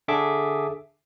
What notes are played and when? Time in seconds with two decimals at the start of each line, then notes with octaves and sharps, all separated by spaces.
0.08 D3 G#4 A4 E5 D6